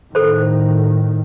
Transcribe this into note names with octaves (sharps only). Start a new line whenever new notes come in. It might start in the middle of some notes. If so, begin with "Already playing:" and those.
A2 D#3 A4 C5